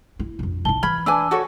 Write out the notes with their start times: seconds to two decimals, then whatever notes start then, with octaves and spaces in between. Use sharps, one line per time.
0.19 E4
0.39 A#1 F2
0.65 B1 E4 A5 G7
0.83 E3 B5 F6 G#6
1.06 D4 B4 G#5 A5 D6 E6
1.31 F#4 A4 C#5